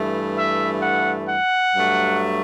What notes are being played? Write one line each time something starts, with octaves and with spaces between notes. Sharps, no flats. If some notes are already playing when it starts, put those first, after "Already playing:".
Already playing: G2 E3 A3
E5
F#5
F#5
G2 F#3 A3